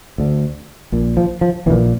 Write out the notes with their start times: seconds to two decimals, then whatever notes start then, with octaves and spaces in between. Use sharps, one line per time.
0.18 D2 D3
0.92 A#1 A#2
1.17 F3
1.41 F3
1.66 A#1 E3
1.70 A#2